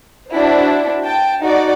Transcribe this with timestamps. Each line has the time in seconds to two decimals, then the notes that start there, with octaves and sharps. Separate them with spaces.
0.31 D4 E4 F#4 C5
1.04 G5 A5
1.40 D#4 F#4 D5